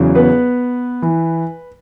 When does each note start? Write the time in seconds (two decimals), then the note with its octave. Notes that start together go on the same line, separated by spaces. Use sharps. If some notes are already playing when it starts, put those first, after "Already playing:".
Already playing: E2 C#3 F#3
0.15 B3 B4
1.02 E3